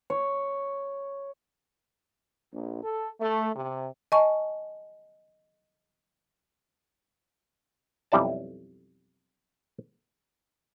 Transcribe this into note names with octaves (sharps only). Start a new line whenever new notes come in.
C#5
A#1
A4
A3
C3
D#5 G#5 A5 C#6
B1 F2 G3 E4 D5 A5